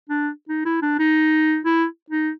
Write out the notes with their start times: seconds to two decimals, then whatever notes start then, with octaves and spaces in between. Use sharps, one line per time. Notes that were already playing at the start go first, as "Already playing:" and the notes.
0.10 D4
0.49 D#4
0.65 E4
0.82 D4
0.99 D#4
1.65 E4
2.10 D#4